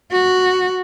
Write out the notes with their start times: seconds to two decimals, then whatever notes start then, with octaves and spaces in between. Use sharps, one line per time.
0.12 F#4